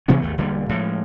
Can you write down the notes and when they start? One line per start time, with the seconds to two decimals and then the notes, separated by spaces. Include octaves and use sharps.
0.08 C3 E3 B3 C#4
0.22 G#1 D#2 A3
0.38 E1 D3 G3 A#3
0.69 A2 F3 G#3